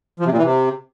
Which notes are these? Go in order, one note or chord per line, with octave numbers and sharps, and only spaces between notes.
F3
C3
A#2
E3
C3